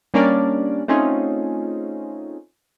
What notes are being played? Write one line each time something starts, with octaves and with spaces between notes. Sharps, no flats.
G3 A#3 C#4 D4 A#4 D5
A3 C4 C#4 D#4 F4 G#4